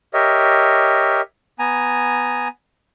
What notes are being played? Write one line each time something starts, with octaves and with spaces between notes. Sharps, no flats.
G4 A#4 C#5 D#5 E5
B3 G#5 A#5